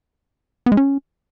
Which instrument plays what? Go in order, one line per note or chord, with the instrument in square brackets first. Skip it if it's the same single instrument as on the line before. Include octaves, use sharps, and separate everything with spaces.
[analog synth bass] B3
G#3
C#4